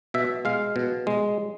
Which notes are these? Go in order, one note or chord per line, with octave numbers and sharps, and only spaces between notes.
B2 E5
G#3 F5
B2
G#3